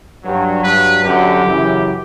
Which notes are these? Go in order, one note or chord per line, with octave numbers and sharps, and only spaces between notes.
G2 F#3
G2 F#3 B4
F#2 D3 F#3 G4
F#2 C#3 E3